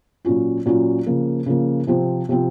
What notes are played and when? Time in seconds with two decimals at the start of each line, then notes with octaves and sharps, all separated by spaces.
0.25 A#2 F#3 C#4 F4
0.66 A#2 F#3 C#4 F4
1.06 C#3 F3 A#3
1.46 C#3 F3 A#3
1.87 C3 F3 C4
2.29 C3 F3 C4